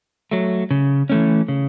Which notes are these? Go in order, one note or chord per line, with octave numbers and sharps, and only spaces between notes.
F#3 A3
C#3
E3 A3 C#4
C#3